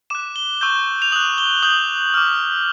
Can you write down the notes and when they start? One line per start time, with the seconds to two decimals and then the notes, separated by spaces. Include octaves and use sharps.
0.10 D6 F#6 E7
0.36 G7
0.61 C#6 E6 G6
1.02 F7
1.12 D#6 F#7
1.16 F#6
1.38 G7
1.63 D#6 G6 F#7
2.14 D6 F6